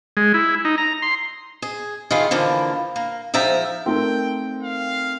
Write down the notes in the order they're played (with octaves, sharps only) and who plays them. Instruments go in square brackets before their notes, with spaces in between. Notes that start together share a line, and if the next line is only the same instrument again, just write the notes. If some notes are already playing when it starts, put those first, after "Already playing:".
[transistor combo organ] G#3
E4
D#4
A#5
C6
[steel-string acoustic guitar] G#4
D#3 E4 F4 G#4
D3 E3 F3 A#3
A#3
G#2 F3 E5 G5 A#5
[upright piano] A3 D#4 A#4 [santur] C4 [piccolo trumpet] G5
[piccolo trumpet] F5